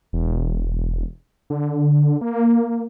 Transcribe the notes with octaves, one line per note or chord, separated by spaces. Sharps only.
E1
D3
A#3